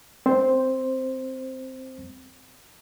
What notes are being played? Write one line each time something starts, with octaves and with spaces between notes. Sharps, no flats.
C4 C5